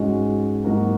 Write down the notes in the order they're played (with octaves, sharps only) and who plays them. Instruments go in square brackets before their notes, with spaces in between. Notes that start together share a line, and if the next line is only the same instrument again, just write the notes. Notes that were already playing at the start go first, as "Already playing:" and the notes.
Already playing: [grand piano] G#2 G#3 C#4 F#4
G#2 F#3 A#3 F#4 A#4